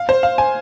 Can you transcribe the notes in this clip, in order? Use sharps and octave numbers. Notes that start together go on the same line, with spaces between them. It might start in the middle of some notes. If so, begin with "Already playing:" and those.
Already playing: F5
C5
F5
G#5